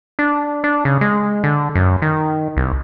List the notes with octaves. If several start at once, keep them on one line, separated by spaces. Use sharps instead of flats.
D4
D4
C#3
G#3
D3
F#2
D#3
C2